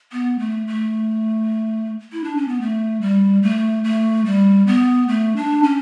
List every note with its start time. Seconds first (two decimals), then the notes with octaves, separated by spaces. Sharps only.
0.12 B3
0.39 A3
0.67 A3
2.12 E4
2.24 D4
2.37 C#4
2.48 B3
2.61 A3
3.01 G3
3.43 A3
3.84 A3
4.26 G3
4.67 B3
5.08 A3
5.36 D4
5.63 C#4